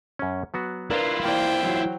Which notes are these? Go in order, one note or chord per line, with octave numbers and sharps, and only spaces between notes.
F#2 C#4
F#3 B3 F#4
D4 E4 F4 A#4 B4 D5 A#5
E3 A#3 C5 D5 G5
E3 F#3